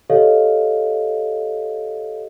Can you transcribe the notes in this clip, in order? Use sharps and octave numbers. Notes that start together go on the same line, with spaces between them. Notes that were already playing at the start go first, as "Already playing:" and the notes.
G4 A4 C#5 D#5 F5